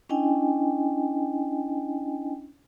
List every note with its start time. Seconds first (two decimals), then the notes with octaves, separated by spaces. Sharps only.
0.09 C#4 D4 E4 D#5 G5 G#5